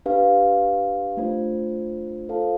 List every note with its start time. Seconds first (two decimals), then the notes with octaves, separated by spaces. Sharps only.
0.06 D4 G4 B4 F5
1.17 A3 D4 F4 C5
2.29 F4 A4 C5 F5 A5